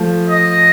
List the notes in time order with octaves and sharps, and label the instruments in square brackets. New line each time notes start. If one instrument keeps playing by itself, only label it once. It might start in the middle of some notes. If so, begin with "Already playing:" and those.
Already playing: [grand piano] F3 A3
[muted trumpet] D#5